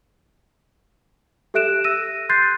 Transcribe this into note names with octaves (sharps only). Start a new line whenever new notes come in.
G4 A4 E5 F#6 D7 E7
E6 A#6 D#7
C6 F#6 G6 A6 C7